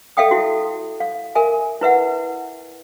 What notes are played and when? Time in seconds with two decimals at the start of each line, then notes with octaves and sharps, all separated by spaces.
0.17 A4 E5 F5 G5 D#6
0.31 E4 F#4
1.00 F5
1.35 A#4 E5 G#5
1.81 E4 B4 E5 F#5